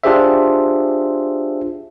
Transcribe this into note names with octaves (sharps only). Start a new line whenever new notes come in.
D4 F4 G4 G#4 C5 E5